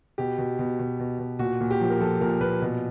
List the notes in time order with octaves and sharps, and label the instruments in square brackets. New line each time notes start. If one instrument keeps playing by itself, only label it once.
[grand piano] B2 G4
B2
B2
B2
B2
B2
A#2 F#4
A#2
G4
F3
A#4
F3 A4
A#2 A#4
A#2 B4
B2